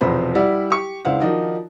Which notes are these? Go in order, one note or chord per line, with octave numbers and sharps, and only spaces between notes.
B1 E2 C3 F3 C5 B5
G3 E4 G4 D5 F#5
G4 C#6
C#2 D4 E4 C5 F5 F#5
D#3 F3 D4 D#4 F#4 D5